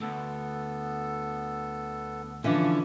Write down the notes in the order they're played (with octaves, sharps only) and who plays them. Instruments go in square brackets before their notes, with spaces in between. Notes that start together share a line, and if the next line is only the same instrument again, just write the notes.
[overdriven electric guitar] D2 [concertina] B3 A4
[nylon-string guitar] D3 E3 F3 [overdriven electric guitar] C#4 [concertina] E5 F5